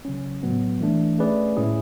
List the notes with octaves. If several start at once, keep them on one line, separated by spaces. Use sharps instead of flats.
C#3 F#3 C#4
A2 F#3 B3
E3 A3 D4
A3 C#4 G#4 B4 D5
A2 G#3 C#4 E4 G#4